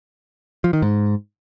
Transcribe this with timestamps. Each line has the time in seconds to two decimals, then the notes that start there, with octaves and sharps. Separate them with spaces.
0.64 F3
0.73 D#3
0.82 G#2